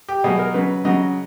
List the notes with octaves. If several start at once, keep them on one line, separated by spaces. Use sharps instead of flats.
G4
B2 F#3 G#4
A#4
C#3 F#3 B4
C#3 F#3 D#5